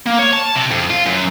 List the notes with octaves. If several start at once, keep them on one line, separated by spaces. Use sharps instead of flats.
A#3
C#5
A5
C3
F2
F4
F#2